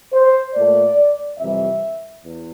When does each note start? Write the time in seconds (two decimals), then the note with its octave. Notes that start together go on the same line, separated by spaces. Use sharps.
0.13 C5
0.55 A#2 A3 D5
1.39 F2 C3 E3 G3 E5
2.24 E2